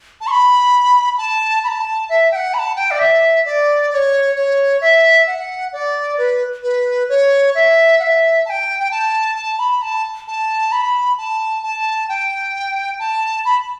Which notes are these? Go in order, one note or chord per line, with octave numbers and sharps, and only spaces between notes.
A5
C#6
B5
A5
B5
A5
E5
G5
F#5
B5
A5
G5
D5
E5
D5
D5
C#5
C#5
E5
F#5
D5
B4
B4
C#5
E5
F#5
E5
A5
G5
G5
A5
A5
B5
A5
A5
B5
A5
A5
G5
A5
B5